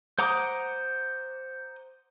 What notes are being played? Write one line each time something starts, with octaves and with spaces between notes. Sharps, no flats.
C5 F#5 A#5 D6 D#6